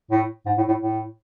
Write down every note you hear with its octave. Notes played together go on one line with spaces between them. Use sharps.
A2
G#2
A2
A2
A2